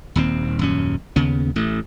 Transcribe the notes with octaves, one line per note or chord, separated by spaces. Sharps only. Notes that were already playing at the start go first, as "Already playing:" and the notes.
D#1 D#2 C4
D#1 F#2 C#4
D#2 C#3 B3
A1 A3